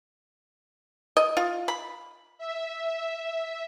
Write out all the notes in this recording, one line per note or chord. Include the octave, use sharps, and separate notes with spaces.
D#5
F4
B5
E5